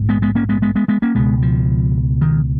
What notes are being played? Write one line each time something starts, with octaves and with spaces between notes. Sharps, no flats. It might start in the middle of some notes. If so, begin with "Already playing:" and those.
Already playing: A#1 G#2
G#3 B3
G#3 B3
A#3 C#4
G#3 B3
G#3 B3
G#3 B3
G#3 B3
A#3 C#4
C#2 B2 G#3 B3
F3
D#3